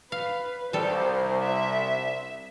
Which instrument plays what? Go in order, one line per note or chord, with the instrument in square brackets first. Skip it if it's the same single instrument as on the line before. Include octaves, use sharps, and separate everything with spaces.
[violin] B4 [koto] F5
[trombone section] C2 [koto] G3 A4 [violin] C5
[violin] E5